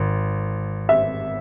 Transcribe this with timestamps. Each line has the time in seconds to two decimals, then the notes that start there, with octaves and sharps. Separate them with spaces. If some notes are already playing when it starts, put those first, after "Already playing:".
Already playing: G#1
0.89 E5